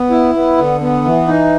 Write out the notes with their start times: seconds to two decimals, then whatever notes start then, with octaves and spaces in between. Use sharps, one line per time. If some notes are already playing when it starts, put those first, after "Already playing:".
Already playing: B3
0.10 E4
0.35 B3
0.58 D3
0.81 B3
1.04 E3
1.27 D#4